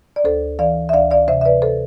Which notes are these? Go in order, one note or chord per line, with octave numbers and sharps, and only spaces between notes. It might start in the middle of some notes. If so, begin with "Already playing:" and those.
D5
D2 A4 C5
E3 D5 F5
E5
D2 D5 F5
D5 F5
C3 C5 E5
E5
B4 D5
A4 C5